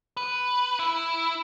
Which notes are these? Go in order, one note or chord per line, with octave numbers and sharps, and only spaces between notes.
B4
E4